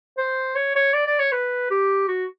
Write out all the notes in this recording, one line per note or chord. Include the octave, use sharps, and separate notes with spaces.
C5
C#5
C#5
D5
D5
C#5
B4
G4
F#4